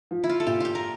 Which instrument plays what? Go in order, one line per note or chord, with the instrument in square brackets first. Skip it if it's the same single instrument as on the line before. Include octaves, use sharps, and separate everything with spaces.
[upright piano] F3
[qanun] E4
F4
A4
[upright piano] A#2 [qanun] G4
[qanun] F4 G4
A#4